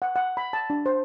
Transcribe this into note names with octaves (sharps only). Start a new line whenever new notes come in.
F#5
F#5
B5
A5
D4
C5